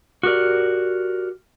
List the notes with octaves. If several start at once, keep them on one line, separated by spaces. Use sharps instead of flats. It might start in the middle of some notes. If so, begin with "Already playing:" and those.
F#4 G4 A#4 D5